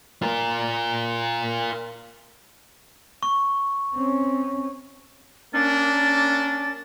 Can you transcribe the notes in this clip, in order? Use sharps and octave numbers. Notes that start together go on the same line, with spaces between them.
F4 A#4
C#6
C4 C#4
A#3 C#4 D4 A6